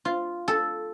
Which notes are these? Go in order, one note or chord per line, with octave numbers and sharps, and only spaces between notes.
F4
A4